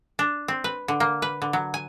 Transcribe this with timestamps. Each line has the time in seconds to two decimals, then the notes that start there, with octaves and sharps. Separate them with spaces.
0.19 D4
0.48 C4
0.64 B4
0.88 D3
1.00 A#3
1.22 B4
1.42 D3
1.53 F#3
1.74 G#5